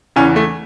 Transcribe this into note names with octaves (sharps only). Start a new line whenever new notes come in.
E2 C#3 E3 C#4
A3